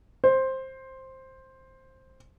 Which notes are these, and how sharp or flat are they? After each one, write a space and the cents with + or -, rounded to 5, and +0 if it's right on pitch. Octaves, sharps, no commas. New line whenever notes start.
C5 +10